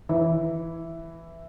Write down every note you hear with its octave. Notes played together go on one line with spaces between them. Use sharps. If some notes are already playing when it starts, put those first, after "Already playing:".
E3 E4